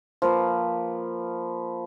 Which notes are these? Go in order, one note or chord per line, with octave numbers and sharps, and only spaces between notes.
F3 A#3 B4